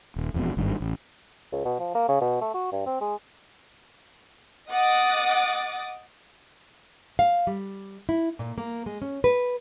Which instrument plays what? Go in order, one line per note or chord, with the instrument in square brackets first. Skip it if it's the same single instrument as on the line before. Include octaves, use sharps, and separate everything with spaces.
[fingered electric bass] D#1
E1 F2 G#2 B2
G#1 G2 D#3
A1
[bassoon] C#2
B2
F3
A#3
C#3
B2
A3
F#4
G2
C4
G#3
[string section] D#5 F#5 D6 D#6 A6
[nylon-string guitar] F5
G3
E4
A#2
A#3
G#3
C#4
B4